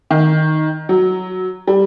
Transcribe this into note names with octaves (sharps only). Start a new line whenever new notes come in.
D#3
F#3
G3